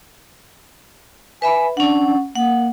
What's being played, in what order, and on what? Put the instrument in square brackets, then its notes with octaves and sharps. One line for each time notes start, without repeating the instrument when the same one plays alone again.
[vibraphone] B4 E5 B5 [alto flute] G#5
[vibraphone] C#4 F#5 [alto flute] D4
[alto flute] A#3 [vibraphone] F#5